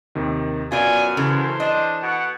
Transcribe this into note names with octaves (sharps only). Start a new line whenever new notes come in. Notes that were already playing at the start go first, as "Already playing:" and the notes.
D#2 C3 D#3
F#2 B2 F4 D5 G#5
C#3 E3 A4 C5
D4 D#5
B2 F#5